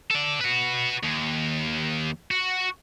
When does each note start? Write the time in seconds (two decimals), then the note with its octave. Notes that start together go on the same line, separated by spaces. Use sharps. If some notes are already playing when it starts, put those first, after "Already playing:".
0.11 A4 D5
0.41 F#4 B4
1.04 D#2
2.31 F#4